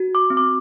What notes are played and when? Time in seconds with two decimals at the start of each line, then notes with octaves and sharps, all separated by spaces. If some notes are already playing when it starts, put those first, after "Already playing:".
Already playing: F#4
0.15 D6
0.30 C4
0.37 D6